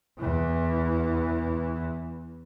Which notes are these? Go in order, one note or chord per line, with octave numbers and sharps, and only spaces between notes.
E2 E3